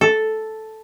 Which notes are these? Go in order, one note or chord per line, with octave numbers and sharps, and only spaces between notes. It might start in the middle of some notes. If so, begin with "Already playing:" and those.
A4